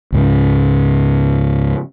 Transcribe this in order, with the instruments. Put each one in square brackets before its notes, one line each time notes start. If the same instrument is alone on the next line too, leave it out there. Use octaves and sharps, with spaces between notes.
[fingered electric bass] C#2 G#2 C#3